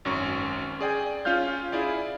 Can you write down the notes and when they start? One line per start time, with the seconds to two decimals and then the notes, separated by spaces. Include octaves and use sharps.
0.05 G#1 F#2 C#4 C#6
0.81 G#4 D5 G5 G#5
1.25 C#4 F4 F5 F6 G6
1.72 E4 G#4 D5 F5